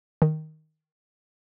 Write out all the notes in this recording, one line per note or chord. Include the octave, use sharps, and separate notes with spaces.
D#3